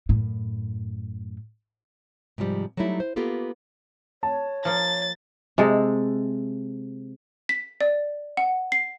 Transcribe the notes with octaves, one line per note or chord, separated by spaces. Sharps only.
F#2 A2
G#2 C3 F3 G3
F#3 G3 A3 D#4 E4
C5
A#3 B3 F4 G4 A4
C#5 A5
F3 A#3 A6
C3 G#3 A4
B6
D5
F#5
C7